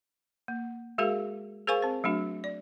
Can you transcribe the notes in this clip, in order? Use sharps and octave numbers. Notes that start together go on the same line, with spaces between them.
A#3
G#3 F#4 G#4 A#4 F5
G#4 A#4 C5 F5 G#5 C#6
C4 C5
F#3 A3 D4 F#4
D5